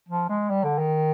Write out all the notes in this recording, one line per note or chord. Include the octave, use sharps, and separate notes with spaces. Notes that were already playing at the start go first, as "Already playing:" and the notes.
F3
G#3
G3
D3
D#3